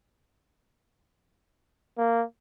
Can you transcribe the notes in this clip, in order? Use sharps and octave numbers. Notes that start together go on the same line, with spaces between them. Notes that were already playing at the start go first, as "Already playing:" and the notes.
A#3